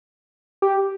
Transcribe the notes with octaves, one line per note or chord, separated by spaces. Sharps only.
G4